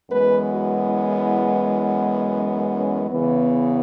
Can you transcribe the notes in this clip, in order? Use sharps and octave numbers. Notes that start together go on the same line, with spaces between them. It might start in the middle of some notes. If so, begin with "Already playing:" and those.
F#2 E3 G#3 B3 B4
F#4
E4
C#4
C#4
E2 C#3 E3 B3